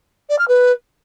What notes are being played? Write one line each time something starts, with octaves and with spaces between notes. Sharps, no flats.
D5
F6
B4